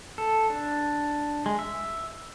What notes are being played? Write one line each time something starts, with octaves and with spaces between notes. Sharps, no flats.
A4
D4
G#3
E5